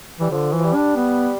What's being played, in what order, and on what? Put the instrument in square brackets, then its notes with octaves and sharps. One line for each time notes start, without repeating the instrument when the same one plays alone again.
[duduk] E3 [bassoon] G3
[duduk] D3 [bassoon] F3
[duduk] E3
[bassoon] F3
G3
[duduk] D4
B3